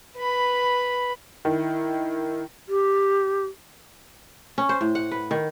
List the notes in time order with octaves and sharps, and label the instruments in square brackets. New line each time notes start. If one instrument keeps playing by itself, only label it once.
[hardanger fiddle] B4 B5
[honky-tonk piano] D#3 [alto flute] E4
[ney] G4
[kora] C#4
C5
A2
F#5
B4
D#3